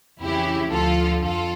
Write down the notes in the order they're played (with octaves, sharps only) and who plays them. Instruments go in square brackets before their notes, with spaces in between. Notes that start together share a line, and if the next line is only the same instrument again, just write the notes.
[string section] F2 C#3 E3 E4 G4
D2 D3 F3 F4 A4
F2 F4 A4